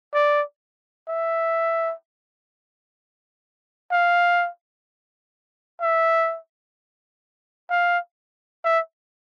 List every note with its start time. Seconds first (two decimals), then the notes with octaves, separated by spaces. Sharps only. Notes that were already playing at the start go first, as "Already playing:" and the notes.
0.14 D5
1.08 E5
3.92 F5
5.81 E5
7.70 F5
8.65 E5